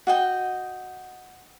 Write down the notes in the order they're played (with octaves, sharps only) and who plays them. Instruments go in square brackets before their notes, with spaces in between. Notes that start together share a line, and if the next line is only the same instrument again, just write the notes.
[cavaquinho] F#4 D#5 G5